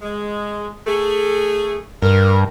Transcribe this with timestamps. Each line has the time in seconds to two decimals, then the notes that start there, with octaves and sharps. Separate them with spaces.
0.02 G#3
0.86 A3 G#4
2.02 G2 A#4